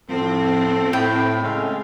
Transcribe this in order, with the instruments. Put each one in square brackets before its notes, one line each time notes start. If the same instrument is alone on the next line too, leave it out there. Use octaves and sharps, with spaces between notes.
[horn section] A2 F3 [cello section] C4 [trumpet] A4
[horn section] A2 [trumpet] E4 [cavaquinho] G5
[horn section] C#3 A3 F5 [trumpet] G#3